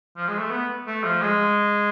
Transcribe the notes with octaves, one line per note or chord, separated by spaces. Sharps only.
F3
G#3
A3
B3
A3
F3
G#3